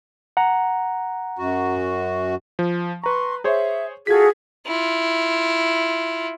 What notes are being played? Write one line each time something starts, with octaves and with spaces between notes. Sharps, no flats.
F#5 A#5
F#2 F#4
F3
B4 A#5 C6 C#6
G#4 C5 C#5 E5
F4 F#4 G#4 A4 G#6 B6
E4 F4